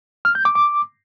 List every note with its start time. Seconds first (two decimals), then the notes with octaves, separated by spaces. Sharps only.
0.25 F6
0.35 G6
0.45 D6
0.55 D6